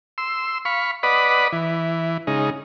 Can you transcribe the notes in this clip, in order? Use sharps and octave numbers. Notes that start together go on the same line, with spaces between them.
C6 E6
F5 B5 C#6
B4 D5 D#5 F#5 B5
E3
C#3 G#3 D#4